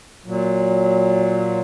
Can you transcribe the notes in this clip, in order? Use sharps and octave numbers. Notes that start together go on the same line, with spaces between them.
A#2 F#3